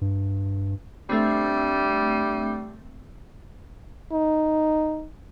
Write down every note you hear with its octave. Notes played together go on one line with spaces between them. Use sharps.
G2
G3 A3 C4 D4 E5
D#4